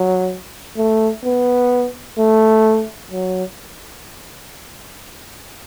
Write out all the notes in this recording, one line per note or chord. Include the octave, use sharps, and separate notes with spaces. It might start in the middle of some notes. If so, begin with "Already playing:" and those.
Already playing: F#3
A3
B3
A3
F#3